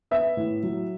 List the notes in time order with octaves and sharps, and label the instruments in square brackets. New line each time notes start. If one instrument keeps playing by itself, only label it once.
[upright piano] B3 E5
A2
F#3